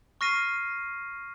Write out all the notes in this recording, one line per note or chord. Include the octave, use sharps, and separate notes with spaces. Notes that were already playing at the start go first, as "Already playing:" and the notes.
C#6 F6 A#6 C7 D#7